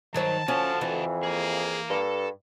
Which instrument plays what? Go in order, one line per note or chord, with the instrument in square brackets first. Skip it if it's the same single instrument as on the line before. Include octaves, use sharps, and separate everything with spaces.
[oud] G2 F#3 C5 [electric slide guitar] D#3 [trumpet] A5
[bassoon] F3 [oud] C#4 [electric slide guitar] F#4 A4
[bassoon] F2 [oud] E3
[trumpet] A#3 [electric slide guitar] G#4
[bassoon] G2 [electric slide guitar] A4